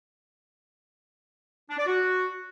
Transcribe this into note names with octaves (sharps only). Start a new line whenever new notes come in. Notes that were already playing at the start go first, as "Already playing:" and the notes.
D4
D5
F#4